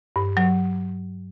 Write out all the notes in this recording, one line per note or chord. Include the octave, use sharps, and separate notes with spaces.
G2
F#3